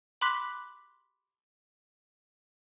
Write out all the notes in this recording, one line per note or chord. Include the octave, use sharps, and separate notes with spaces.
B5 C6 D6 F#6 B6